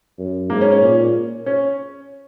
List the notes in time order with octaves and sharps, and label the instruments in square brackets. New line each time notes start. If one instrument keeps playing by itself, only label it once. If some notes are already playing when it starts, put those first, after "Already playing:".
[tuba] F#2
[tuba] G#2 [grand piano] A#3
[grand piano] C#4
C#4
[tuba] A#2
[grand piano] C#4